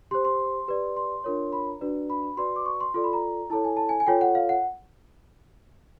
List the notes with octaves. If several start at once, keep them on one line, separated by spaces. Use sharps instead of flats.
G4 C5 C6
C6
G4 B4 D5
C6
D4 F4 A#4 C#5
B5
A#5
D4 F#4 B4 D5
B5
B5
F#4 B4 D5 C6
D6
C#6
C6
F4 A4 D5 C6
B5
A#5
E4 A4 C#5 A5
G#5
A5
G#5
G#5
F4 A4 C#5 G5
F#5
F5
F#5